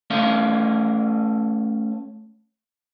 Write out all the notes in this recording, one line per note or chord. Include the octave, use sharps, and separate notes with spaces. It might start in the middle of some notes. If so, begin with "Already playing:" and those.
A3 C#4 F5